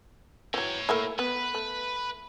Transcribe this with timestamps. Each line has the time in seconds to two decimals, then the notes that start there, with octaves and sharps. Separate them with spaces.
0.54 E3 F#3 C#5 G5
0.89 A3 A#3 E4
1.19 B3 B4
1.55 A3